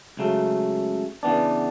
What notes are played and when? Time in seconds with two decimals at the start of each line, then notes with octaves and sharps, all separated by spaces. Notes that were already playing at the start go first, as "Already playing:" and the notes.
0.17 C#2 C#3 F#3 A3
1.23 C#3 E3 B3 D4